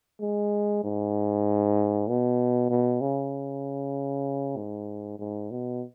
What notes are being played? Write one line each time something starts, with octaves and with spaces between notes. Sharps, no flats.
G#3
G#2
B2
B2
C#3
G#2
G#2
B2